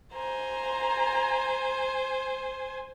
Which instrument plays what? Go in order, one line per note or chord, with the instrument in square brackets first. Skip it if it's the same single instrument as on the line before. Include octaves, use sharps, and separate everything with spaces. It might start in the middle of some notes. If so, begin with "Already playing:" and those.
[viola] C5 G#5 [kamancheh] A#5